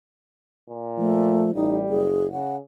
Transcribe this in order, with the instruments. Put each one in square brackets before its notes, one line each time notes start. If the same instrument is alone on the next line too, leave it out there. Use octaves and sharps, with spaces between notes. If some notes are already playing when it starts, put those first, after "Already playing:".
[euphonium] A#2
[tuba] F3 [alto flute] A3
[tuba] A1 [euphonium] G3 [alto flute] D#4
[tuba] F#1 [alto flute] G#4
[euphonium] C#3 [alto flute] F#5